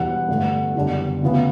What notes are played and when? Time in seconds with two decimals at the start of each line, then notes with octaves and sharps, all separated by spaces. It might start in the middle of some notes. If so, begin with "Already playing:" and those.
Already playing: E1 E2 B2 G3 F#5
0.29 G2 D3 A3 D4
0.75 F#1 E2 D3 G3 D4
1.22 D2 C#3 E3 B3